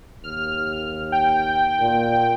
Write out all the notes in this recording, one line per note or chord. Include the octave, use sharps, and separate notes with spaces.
D#2 F6
G5
A#2